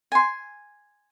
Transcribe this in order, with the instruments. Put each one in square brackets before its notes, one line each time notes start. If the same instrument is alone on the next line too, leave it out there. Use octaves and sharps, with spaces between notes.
[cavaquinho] G#5 C6